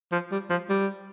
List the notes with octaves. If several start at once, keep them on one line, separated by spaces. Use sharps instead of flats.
F3
G3
F3
G3